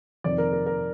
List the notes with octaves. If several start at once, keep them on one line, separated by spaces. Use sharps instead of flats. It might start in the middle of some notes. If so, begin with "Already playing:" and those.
F2 C3 D#3 D5
A#4
A#4
A#4